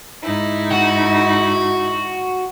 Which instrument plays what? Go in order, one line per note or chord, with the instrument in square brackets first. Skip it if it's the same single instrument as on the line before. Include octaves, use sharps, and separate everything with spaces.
[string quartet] G#2 D#4 E4
[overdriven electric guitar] F#4